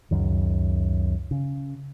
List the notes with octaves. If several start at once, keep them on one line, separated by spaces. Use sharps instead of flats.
C#2 F#2 D#3
C#3